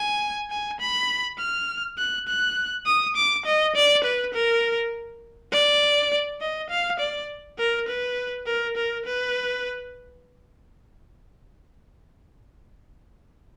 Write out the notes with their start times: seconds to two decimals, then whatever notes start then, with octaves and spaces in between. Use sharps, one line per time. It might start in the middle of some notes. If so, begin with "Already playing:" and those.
Already playing: G#5
0.51 G#5
0.80 B5
1.39 F6
1.98 F#6
2.28 F#6
2.86 D#6
3.16 D6
3.45 D#5
3.75 D5
4.04 B4
4.34 A#4
5.52 D5
6.41 D#5
6.70 F5
7.00 D5
7.58 A#4
7.88 B4
8.46 A#4
8.77 A#4
9.06 B4